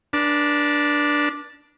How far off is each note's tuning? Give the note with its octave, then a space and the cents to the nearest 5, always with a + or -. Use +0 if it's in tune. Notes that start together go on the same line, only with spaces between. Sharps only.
D4 +0 B4 -40